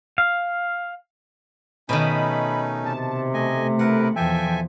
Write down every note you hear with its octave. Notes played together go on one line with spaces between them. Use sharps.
F5
B2 D#3 A3 C#4 D#4 B5
C3 A5
A3 D#5 G#5
E4 A#4 B4 F#5
E2 F3 A4 E5 G5 G#5